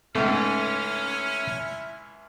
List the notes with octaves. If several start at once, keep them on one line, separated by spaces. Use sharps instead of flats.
C#2 G#2 A3 C#4 E4 C#5 E5 F6